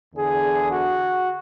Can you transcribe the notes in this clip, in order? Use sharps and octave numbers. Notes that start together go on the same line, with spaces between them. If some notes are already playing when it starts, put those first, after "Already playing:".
E2 D3 G#4
F#4